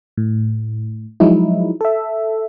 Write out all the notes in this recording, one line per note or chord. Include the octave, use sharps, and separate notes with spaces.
A2
F3 F#3 G#3 D#4 E4
A4 E5